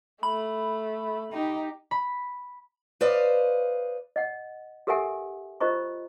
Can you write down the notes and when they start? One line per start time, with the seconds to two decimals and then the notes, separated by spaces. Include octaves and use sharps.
0.23 A3 B5
1.33 D#4 G4
1.91 B5
3.01 B4 C5 D5 D#5 F5
4.16 D#5 F#5
4.87 G4 A4 A#4 E5 F#5 G#5
5.61 F4 A#4 C5 D#5 A#5 C#6